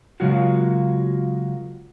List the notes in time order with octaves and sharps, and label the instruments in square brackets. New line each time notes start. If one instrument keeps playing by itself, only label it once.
[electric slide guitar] C#3 F#3 G#3 A#3 F4 F#4